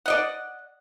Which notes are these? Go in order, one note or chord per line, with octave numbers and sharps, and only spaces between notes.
D5 D#5 F#5